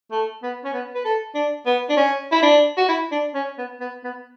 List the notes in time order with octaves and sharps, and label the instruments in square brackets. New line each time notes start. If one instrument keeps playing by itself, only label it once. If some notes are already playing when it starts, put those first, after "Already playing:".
[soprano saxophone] A3
B3
C#4
B3
B4
A4
D4
B3
D4
C#4
E4
D4
F#4
E4
D4
C#4
B3
B3
B3